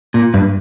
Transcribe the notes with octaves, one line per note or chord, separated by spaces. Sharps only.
A#2
G2